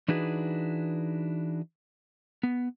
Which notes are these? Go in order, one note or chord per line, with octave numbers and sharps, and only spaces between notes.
E3 D4 D#4 F#4 G#4 B4
B3